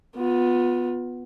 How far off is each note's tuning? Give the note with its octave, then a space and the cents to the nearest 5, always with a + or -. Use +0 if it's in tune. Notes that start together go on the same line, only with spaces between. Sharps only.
B3 +0 F4 +25